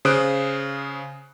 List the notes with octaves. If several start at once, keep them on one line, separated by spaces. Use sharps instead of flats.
C#3 C5 D#6 F#6 D7